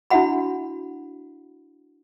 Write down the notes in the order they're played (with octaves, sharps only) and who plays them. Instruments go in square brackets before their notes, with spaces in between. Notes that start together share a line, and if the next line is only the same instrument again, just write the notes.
[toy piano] D4 E4 F#4 E5 F#5 B5